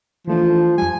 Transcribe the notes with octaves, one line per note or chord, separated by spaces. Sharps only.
E3 F3 A3 D4
F2 G3 G#5